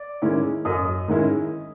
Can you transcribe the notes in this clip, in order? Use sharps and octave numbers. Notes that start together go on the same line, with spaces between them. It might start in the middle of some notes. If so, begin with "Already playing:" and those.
Already playing: D5 D6
D#3 G#3 C#4 E4
F#2 D#5 D#6
D#3 G#3 C#4 E4